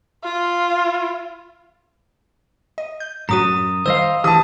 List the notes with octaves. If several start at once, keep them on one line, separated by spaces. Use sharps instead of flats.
F4
D#5
G6
F#2 A2 F#3 F#4 A#5 D#6 D#7
D#3 G3 C5 D#5 F5 E6
E3 G4 A5 D#6